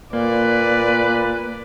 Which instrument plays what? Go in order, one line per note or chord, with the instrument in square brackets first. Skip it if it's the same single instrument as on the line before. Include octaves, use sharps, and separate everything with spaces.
[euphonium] A#2 [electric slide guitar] A#3 [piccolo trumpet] B4 [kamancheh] D5